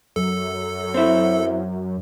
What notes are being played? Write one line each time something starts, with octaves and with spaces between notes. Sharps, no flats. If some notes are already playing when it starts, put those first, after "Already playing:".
F#2 A4
C4 E4